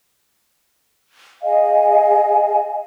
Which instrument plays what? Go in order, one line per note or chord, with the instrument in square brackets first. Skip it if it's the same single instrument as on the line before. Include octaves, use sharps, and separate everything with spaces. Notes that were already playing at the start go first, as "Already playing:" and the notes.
[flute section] G#4 D#5 F5 G#5